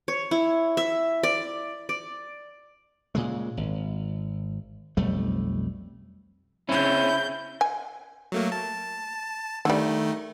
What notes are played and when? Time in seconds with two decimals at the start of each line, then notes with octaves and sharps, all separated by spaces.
0.08 C#5
0.31 E4
0.77 E5
1.23 D5
1.89 D5
3.15 A#2 C#3 G#3
3.57 G#1
4.97 B1 F2 G3 A3
6.69 C#3 C4 C#4 E4 G6
7.61 G#5
8.32 F#3 A3 A#3
8.52 A5
9.65 D3 D#3 G3 A3